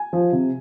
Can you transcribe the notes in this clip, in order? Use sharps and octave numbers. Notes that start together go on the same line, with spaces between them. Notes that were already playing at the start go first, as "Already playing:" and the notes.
Already playing: G#5
F3
C3